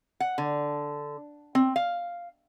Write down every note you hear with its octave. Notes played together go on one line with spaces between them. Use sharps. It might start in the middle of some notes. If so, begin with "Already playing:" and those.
F#5
D3
C4
F5